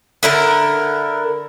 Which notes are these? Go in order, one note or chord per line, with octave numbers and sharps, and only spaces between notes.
D3 E4 A#4